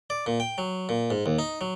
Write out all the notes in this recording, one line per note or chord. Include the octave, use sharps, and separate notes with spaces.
D5
A#2
G5
F#3
A#2
G#2
D#2
D#4
F#3